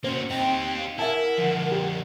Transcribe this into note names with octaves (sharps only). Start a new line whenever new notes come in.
A#3 C#4 F#4 C5
C4 D#4 G4 G5
F5
E4 A#4 E5 F#5 G#5 A5
D3 F3
G4